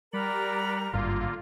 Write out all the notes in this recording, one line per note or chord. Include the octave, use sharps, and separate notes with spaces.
G3 A#4 D5 F#5 A#5 B5
G#1 G2 D3 A#3 F4